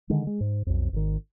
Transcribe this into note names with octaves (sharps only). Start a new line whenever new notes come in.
D3 D#3 G#3
G#3
G#2
B1 F2
G#1 D#3